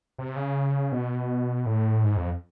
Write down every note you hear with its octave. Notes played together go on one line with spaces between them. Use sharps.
C3
C#3
B2
A2
G#2
F2